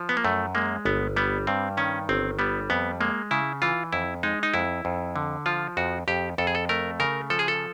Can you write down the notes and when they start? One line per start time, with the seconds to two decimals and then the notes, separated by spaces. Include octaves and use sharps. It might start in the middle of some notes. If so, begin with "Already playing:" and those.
Already playing: F3
0.09 B3
0.17 A#3
0.25 F#2 A3
0.55 G#3 A#3
0.85 G1 B3
1.16 G3 B3
1.47 G2 C4
1.77 D#3 C#4
2.09 G1 C4
2.39 G3 B3
2.70 F2 B3
3.01 G#3 A#3
3.31 C#3 E4
3.62 E3 F4
3.93 F2 E4
4.23 G#3 D#4
4.43 D#4
4.54 F2 E4
4.85 F2
5.16 D3
5.46 F3 F4
5.77 F2 F#4
6.08 F2 G4
6.38 F2 A4
6.47 G#4
6.55 A4
6.69 A3 A#4
7.00 C#3 A#4
7.30 F3 A4
7.39 G#4
7.48 A4